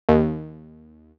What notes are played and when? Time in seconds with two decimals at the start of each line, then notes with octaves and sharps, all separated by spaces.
0.09 D#2